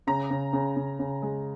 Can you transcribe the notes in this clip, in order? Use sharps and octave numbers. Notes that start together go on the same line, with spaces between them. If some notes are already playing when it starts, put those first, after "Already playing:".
C#3 A#5
C#3
C#3
C#3
C#3
G#3